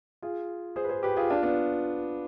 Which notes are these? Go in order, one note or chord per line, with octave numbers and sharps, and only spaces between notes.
F4 G#4
G#4 C5
B4
G#4 C5
G4 B4
F4 G#4
D4 F4
B3 D4